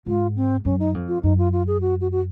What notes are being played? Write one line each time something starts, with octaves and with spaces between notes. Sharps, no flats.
G#2 F4
C4
F#2 C#4
D#4
F2
F4
F#2 D#4
F4
F4
G#4
F#4
F#4
F#4